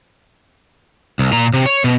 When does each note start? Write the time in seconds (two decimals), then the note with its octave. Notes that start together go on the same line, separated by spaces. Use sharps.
1.19 C2
1.33 A#2 A#5
1.53 C3
1.66 C#5
1.84 B2